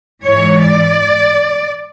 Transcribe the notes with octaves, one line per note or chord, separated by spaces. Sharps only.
G#2 E3 C#5
D5